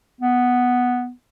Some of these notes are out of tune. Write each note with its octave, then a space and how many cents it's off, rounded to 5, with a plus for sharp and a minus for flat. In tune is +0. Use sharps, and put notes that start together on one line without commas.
B3 +0